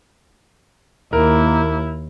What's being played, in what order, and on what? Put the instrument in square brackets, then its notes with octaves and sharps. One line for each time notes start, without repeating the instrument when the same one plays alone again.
[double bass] D#2 [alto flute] A#3 [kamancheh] E4 [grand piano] A#4